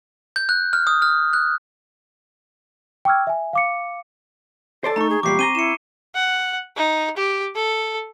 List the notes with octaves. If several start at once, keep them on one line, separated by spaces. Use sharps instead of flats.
G6
F#6
F6
D#6
F6
F#6
G5 C#6 D6 E6 F6 G#6
E5 G#5
F5 D6 C#7
A4 C5 D5 A5
A3 D#4 A#5 C#6
G#4
E2 A#2 G3 G4 D6 C7
C4 G#5 A#5 D#7 G7
E4 C#7 E7
F#5
D#4
G4
A4